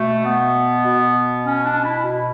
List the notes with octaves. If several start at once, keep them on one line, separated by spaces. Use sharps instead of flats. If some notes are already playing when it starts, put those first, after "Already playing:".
Already playing: B2 A3
B3
B2
C#4
D4
E4
B2